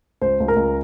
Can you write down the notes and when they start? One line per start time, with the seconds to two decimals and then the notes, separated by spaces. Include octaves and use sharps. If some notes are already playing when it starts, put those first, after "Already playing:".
0.21 C#2 C5
0.40 C#2
0.48 A#4
0.56 C#2